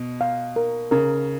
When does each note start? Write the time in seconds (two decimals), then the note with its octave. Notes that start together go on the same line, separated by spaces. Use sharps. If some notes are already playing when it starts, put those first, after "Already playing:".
Already playing: B2
0.21 F5
0.56 A#4
0.91 C#3 A#4